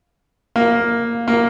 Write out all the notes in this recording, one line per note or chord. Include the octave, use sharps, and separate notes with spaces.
A#3
A#3